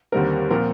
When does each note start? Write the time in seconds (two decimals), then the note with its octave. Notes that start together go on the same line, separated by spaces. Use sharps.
0.12 D#2 D3 G3 C4 A#4
0.50 A#2 F3 C4 A#4